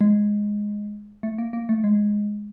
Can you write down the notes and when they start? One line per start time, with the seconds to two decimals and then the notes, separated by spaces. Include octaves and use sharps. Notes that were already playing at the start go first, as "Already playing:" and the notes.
0.01 G#3
1.23 A3
1.38 A#3
1.53 A#3
1.69 A3
1.84 G#3